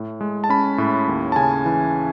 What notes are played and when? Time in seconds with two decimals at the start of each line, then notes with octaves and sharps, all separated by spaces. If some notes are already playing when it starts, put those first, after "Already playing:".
Already playing: A2
0.21 G#3
0.44 A5
0.49 C#4 B5
0.78 A2
1.08 D#2
1.32 A5
1.36 C#3 G#5
1.65 E3